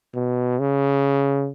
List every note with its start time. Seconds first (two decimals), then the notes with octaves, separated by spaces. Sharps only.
0.15 B2
0.60 C#3